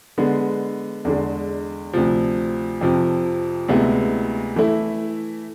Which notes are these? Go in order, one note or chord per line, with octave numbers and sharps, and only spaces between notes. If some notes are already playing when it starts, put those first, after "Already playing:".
D3 G#3 B3
E2 D3 G#3
D2 C3 F3
F2 C3 F3
D2 C3 G#3 B3 E4
E3 A3 E4